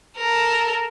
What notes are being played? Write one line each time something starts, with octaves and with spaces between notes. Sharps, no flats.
A4 A#4